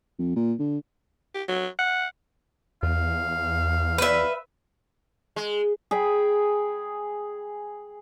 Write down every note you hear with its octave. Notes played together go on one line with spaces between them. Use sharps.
F2
A#2
D3
G4
F#3
F#5
E2 F5
B4 E5
G#3
G#4 G5 B5